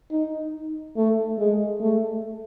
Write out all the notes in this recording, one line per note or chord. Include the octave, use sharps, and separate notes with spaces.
D#4
A3
G#3
A3